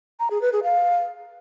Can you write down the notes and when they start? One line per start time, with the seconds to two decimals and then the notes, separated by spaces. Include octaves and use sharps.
0.20 A#5
0.31 G#4
0.42 B4
0.53 G#4
0.64 F5